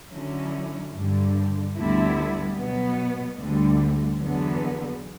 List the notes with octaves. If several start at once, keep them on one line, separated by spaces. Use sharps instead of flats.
D3 F#3 C#4 E4
G2 D3 G3
D2 D3 G3 B3 E4
B2 F#3 B3
D2 D3 G3
E2 D3 F#3 B3